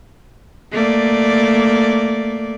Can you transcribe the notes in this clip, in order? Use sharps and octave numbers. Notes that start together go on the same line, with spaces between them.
A3 A#3 D5